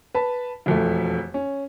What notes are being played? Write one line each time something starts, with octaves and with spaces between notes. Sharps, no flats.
B4 A5
E1 F2 A3
C#4